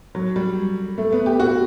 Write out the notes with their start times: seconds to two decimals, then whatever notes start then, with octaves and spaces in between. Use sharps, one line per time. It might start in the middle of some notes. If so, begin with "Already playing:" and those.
0.15 F#3
0.36 G3
0.98 A3
1.13 B3
1.26 G4
1.40 F#4